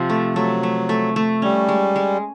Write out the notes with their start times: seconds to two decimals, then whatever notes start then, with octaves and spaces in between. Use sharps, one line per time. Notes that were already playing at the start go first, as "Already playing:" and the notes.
Already playing: C3 F3
0.10 A3
0.36 F#3 A3
0.63 A3
0.89 A3
1.16 A3
1.42 G3 C#4
1.69 G#3
1.96 G#3